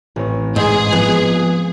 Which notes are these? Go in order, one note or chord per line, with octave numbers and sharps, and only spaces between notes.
A1 C4 C#5
G#2 G#4
F3 G#3 B3